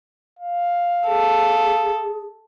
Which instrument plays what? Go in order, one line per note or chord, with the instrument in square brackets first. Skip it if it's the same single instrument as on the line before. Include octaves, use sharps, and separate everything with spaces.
[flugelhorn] F5
[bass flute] G#4 [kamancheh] A4